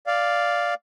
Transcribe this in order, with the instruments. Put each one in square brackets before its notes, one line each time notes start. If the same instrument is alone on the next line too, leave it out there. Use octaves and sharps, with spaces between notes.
[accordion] D5 F5